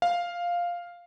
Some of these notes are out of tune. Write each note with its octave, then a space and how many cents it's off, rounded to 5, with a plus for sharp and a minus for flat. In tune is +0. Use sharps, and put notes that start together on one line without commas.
F5 +0